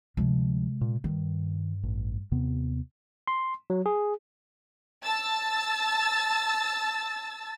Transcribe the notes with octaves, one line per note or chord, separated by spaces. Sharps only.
D2 C3 F3 G#3
A#2
G2 D#3
A1
D#2 C3 B3
C6
F#3
G#4
A5 E6 A6